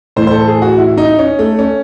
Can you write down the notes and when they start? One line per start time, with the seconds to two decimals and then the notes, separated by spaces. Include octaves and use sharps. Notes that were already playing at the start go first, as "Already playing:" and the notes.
0.16 A2 E3 C5
0.27 C5
0.31 A4
0.47 G#4
0.62 F#4
0.78 E4
0.98 D#4
1.19 C#4
1.39 A3
1.59 C#4